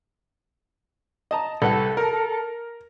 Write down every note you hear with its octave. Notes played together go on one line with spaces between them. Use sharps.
D#5 A5 A#5
C2 A4 B4 F#5
A#4